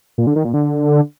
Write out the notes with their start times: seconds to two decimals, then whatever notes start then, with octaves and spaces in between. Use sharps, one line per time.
0.18 A#2
0.27 D3
0.36 D#3
0.45 A#2
0.54 D3